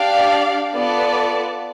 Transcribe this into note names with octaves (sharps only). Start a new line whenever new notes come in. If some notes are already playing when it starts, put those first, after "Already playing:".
Already playing: D4 G4 D5 F5
B3 F4 A4 D5 A5